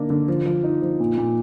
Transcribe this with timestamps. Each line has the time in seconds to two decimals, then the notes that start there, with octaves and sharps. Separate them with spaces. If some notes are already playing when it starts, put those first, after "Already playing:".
Already playing: D3 A#3 D4 D#4
0.10 D3
0.28 F3
0.46 F3
0.64 D#4
0.82 F3
1.00 A#2
1.18 A#2